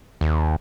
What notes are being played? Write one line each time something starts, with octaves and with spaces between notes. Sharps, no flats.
D#2